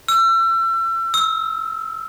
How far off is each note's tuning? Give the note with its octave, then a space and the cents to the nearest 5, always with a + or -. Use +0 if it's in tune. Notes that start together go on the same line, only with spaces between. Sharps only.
E6 +35
E6 -25